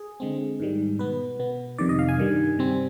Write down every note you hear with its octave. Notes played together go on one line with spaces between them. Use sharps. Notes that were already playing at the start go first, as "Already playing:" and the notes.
Already playing: G#4
D3 G#3 C4
G#2 D#3 G3
B2 B3 B4
B2 B3
F2 C3 D#3 D5
D#5
F5
G#5
G2 D#3 G3
C3 G3 C4